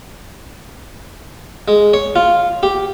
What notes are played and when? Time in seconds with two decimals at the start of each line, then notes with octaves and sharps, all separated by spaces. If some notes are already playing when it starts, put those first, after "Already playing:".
1.68 G#3
1.93 C#5
2.16 F4
2.63 G4